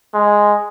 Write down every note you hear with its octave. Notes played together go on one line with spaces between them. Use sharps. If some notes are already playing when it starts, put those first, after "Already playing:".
G#3